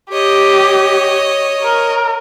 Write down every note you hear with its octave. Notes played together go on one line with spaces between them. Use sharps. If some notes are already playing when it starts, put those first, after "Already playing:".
G4 C#5 D#5
A#4